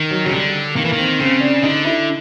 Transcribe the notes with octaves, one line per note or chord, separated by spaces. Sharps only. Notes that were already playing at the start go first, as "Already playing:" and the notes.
Already playing: D#3
F#3
C#3 F#3
D3 G3
D#3 A#3
E3
D#3
C4
C#3 C4
D4
D3 D#4
E4